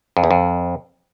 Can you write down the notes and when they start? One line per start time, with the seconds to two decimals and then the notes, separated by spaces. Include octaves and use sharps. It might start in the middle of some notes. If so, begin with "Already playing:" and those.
0.17 F2
0.24 E2
0.31 F2